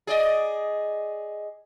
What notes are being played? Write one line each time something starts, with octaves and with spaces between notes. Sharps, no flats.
G#4 D5 D#5